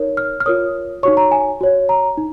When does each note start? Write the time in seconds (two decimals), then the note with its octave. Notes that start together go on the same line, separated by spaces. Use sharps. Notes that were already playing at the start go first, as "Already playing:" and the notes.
Already playing: D#4 A#4 C#5
0.17 F6
0.40 F6
0.46 F4 A#4 C#5 D#6
1.03 D#4 F#4 C#5 C#6
1.17 A#5
1.31 G#5
1.61 F#4 C#5
1.89 A#5
2.17 D#4